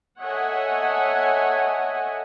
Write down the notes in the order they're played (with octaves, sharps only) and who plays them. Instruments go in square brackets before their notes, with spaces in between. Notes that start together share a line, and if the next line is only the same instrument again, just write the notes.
[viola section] A4 C#5 D#5 E5 F#5 G#5